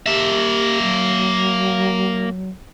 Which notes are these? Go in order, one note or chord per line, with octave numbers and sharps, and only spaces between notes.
A#3 G4 E5
F#3